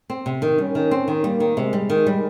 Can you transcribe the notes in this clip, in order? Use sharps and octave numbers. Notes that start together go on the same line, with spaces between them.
C4
C3
D#3
G3 C#4
D#3
C4
D#3
G3 A#3
D#3
C3 G#3
G3
D#3
G3